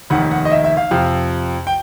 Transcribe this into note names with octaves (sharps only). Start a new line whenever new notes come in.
F1 D#2 D#3 F#5
F#5
D#5
E5
E5
F5
F2 C3 F3
G5